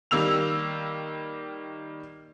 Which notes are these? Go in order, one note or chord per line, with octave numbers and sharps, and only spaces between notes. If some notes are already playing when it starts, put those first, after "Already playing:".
D#3 G3 A#3 E6 F7